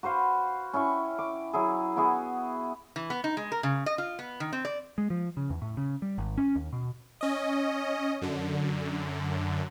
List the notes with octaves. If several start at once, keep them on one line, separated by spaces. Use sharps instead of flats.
F#4 B4 C5 F5
C#4 E4 G5 C#6
D6
F#3 E4 G#4
B3 E4 F#4 G#4
E3
B3
D#4
G#3
A#4
C#3
D#5
F4
B3
D#3
C4
D5
G#3
F3
C#3
E2
A2
C#3
G3
G#1
C#4
D#2
B2
C#4 D#5
F#2 D3